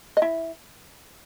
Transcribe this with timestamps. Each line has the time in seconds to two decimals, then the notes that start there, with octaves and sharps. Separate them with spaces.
0.17 D#5
0.22 E4 E5